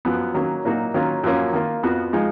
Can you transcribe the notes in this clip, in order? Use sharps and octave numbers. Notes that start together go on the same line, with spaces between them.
F#2 F3 B3
D#3 F#3 A#3 C#4
A#2 F#3 A#3 D#4 F#4
D#3 F#3 A#3 C#4 F4
F#2 F3 A#3 C#4
D#3 A#3 F4
F2 F3 B3 F#4
F3 G#3 D#4